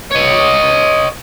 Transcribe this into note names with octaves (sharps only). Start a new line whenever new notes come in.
C#5 D#5